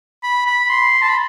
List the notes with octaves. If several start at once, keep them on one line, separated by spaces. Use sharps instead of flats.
B5
B5
C6
A5
B5